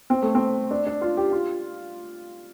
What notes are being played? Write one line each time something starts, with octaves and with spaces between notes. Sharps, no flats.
C4
A3
C4
D4
D4
F4
G4
F4